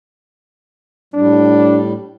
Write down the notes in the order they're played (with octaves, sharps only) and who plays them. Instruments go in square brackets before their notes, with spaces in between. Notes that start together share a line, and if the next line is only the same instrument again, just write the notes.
[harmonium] A2 G3 [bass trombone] D4